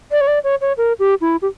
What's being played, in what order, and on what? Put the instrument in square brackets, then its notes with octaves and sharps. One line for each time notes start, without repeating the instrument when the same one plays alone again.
[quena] D5
C#5
D5
C#5
C#5
A#4
G4
E4
G4